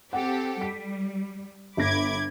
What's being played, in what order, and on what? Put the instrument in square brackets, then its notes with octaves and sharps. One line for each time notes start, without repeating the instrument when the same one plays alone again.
[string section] C4 G4 A4 [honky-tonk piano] F#5
[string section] G3 [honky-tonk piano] B6 D7
[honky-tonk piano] G1 A#6 [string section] B5 D6 G#6